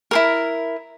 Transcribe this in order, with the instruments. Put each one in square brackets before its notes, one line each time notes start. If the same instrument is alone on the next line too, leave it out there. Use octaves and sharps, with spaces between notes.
[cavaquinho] E4 G#4 A#4